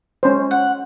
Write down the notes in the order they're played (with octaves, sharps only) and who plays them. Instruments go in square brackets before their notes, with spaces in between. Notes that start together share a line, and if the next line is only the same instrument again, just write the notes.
[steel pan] G#3 C#4 C5
[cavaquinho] F#5